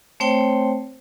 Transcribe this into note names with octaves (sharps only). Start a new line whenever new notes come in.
A3 C4 C5 C#5 G5